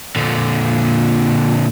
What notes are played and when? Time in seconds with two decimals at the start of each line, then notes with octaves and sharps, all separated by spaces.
0.16 A#2 D3